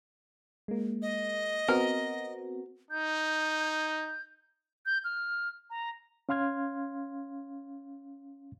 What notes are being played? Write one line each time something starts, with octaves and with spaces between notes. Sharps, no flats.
G#3 A#3
D#5
B3 C4 F#4 A#4
D#4 G6
G6
F6
A#5
C#4 F5 C6 F6 G#6